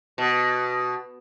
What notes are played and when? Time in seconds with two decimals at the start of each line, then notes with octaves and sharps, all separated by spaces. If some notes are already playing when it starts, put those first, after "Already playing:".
0.18 B2